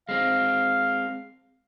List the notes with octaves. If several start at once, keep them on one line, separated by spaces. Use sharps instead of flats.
G#3 C4 F5